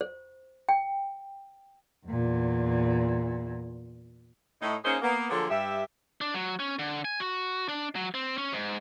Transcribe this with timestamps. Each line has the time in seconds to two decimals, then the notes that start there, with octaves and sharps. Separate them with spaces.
0.01 C5
0.69 G5
2.07 E2 A#2
4.60 A2 D#4
4.83 A#3 C#4 D#4 G#4 C5 C#5
5.01 A#3 B3
5.30 D3 F3 F#3 A#3 G#4 A4
5.49 G2 G4 E5
6.21 D4
6.34 F#3
6.59 C#4
6.79 D3
7.05 G#5
7.20 F#4
7.69 D4
7.95 F#3
8.14 C4
8.38 C#4
8.53 G#2